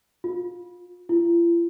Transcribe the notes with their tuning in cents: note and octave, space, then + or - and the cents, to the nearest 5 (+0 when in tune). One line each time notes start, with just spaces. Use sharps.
F4 +25
F4 -45